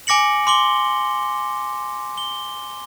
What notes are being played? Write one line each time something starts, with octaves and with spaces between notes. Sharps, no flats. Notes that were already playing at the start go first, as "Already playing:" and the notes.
G#5 D6 A#6 C#7 F#7
C6 D6 G7
G7